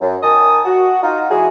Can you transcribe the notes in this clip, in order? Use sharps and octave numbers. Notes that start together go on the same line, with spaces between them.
F#2
D#3 G#5 A5 D#6
F#4
D#4 F4
E3 G#3 F#4 G#4